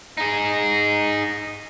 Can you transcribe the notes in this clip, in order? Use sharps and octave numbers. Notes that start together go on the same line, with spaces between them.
D#4 G#4